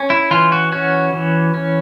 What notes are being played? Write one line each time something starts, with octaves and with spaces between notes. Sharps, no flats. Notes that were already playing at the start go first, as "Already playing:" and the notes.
Already playing: C#4
E4
E3 F4
F#4
C#4 F#4
E3
C#4